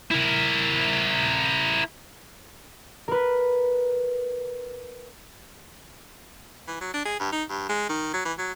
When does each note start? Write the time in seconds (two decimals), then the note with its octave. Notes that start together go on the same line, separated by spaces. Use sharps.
0.11 E4 A#4
3.08 A#4 B4
6.67 E3
6.81 F#3
6.94 D4
7.05 G#4
7.19 G2
7.32 D#4
7.50 G2
7.69 G#3
7.89 D#3
8.13 F#3
8.25 E3
8.38 F#3